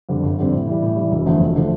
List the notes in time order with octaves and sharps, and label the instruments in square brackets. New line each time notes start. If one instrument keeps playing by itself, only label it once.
[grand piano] F2 D3 G3 C4
G1
F2 D3 G3 C4
A2
E3 G3
A2
E3 G3
E1
E2 D3 F3 A3
E1
D3 F3 A3